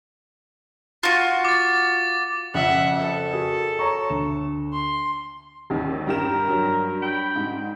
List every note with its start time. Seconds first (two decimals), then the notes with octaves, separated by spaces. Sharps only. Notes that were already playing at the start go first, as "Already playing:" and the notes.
1.03 F4 F#4
1.45 D6 A6
2.54 F2 C#3 F3 E5 F#5
2.99 A4
3.32 F#4 G#4 A#4
3.79 C#5 A#5 C#6
4.10 D2 E7
4.73 C6
5.70 G#1 D#2
6.07 G2 G4 A#4 A#5 E7
6.48 G2 F#3
7.00 D4 G5 B5
7.36 G#2